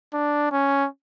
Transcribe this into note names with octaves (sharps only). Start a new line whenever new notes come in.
D4
C#4